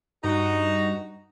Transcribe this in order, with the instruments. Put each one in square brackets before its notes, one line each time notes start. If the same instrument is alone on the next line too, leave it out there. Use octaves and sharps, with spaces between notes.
[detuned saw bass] G2 [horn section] D#4 F#4